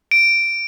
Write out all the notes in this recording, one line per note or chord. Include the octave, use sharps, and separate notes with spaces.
D7